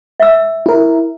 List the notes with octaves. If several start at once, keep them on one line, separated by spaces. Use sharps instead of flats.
E5 E6
E4 A#4